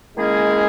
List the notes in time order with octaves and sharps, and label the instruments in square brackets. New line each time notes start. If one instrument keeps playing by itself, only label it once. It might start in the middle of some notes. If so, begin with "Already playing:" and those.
[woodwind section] D#3 A#3 C#4 E4 G#4 [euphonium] G#3